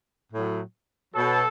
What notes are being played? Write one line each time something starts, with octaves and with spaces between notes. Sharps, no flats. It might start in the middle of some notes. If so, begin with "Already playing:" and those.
A2 F#3
B2 F#3 A4